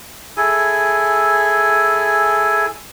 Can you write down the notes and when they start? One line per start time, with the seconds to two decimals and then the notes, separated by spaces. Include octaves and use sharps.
0.37 E4 G#4 A4 G#5